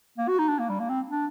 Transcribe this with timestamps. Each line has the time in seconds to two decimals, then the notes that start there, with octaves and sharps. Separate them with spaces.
0.18 A#3
0.28 F#4
0.38 D#4
0.48 D4
0.59 A#3
0.69 G3
0.80 A#3
0.90 C4
1.10 D4